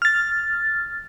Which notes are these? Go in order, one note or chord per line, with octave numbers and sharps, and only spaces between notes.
F6 A6